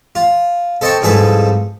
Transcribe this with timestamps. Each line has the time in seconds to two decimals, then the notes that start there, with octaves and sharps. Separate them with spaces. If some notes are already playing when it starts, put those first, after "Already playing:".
0.15 F4
0.81 A4 C5 D#5 G5 A5 C#6
1.02 C2 G#2 F3 G#4 A4 B4